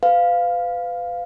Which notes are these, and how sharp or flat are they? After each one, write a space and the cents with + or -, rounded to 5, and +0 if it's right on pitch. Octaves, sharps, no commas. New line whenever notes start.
B4 +30 F5 +0